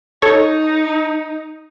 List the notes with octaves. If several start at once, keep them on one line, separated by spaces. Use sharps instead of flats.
D#4 A4 C#5